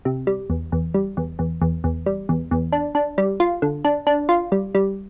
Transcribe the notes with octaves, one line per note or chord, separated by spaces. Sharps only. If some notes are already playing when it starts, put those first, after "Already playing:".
C3
G3
E2
E2
G3
E2
E2
E2
E2
G3
E2
E2
D4
D4
G3
F4
D3
D4
D4
F4
G3
G3